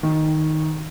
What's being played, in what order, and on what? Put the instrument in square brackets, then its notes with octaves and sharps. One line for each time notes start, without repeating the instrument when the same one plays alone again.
[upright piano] D#3